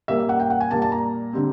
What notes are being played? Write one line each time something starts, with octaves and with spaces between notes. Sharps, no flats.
A#2 G3 A#3 C#4 E5
F#5
G5
F#5
G#5
A#2 G3 A#3 A5
A5
A#5
D3 G3 C4